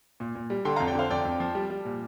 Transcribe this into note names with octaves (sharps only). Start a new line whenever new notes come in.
A#2
A#2
G3
D3 G5 C6
F5 A#5
F2
D5 G5
D3 C5 F5
F2 D5 G5
F2
F3
G3
G3
A#2